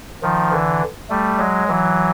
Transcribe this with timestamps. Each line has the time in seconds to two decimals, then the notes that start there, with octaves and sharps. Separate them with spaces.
0.23 D#3 F3
0.52 D3 E3
1.10 G3 A3
1.39 F#3 G#3
1.68 E3 F#3